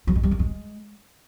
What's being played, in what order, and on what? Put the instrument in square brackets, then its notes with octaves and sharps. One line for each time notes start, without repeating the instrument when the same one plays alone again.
[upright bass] F#3
G#3
G3
D#3
G#3